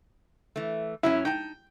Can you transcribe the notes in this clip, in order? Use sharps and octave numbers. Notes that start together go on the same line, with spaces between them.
E3 A3
F#2 F#3 C#4 E4
D#4 G5 A5